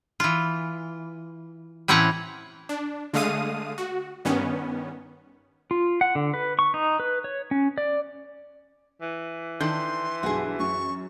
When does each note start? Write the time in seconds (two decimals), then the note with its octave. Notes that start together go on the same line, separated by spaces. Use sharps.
0.20 E3 F4
1.88 A2 E3 C4 C#4 F#5 A#5
2.69 D4
3.14 D3 G#3 A3 F5 D#6 D#7
3.78 F#4
4.25 G2 D#3 B3 C#4
5.71 F4
6.01 F#5
6.15 D3
6.34 B4
6.59 C#6
6.74 D#4
7.00 B4
7.24 C#5
7.51 C#4
7.78 D5
9.02 E3
9.60 D#3 D4 A4 C6 G6
10.23 B1 G2 F#4 G#4
10.59 F#2 C#6